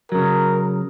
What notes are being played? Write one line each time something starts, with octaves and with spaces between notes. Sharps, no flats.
C#3 F#3 A#4